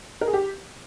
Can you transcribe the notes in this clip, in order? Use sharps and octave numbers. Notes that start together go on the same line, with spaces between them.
A#4
G#4
G4